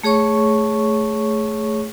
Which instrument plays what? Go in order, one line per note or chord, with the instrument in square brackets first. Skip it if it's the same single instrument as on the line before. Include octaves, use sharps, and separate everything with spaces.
[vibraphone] A3 G#4 C#5 C#6